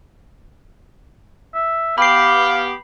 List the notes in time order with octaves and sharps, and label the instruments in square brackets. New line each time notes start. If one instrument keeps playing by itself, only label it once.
[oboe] E5
[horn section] B3 G4 [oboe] F5 [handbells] B5 C7 [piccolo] D6